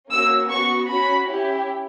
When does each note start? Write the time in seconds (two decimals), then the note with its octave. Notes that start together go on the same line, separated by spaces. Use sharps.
0.11 A#3 C#4 F#4 E6
0.50 B3 F#4 C#6
0.89 C#4 F#4 B5
1.27 C#4 E4 G4